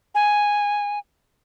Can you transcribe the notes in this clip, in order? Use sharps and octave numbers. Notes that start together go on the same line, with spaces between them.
G#5